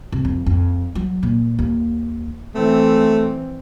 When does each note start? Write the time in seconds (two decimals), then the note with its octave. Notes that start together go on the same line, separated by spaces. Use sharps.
0.12 C3
0.25 F2
0.46 F2
0.95 F#3
1.23 A#2
1.59 D#2
2.55 E3 A3 C4